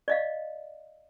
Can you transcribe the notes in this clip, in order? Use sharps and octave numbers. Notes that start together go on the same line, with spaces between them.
D5 D#5 F5